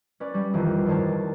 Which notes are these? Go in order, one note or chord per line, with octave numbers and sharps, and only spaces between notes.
C#4 B4 C#5 D5
G3 C#4
F2 D#3 E3
G2 D#3 D4 C5 C#5 A5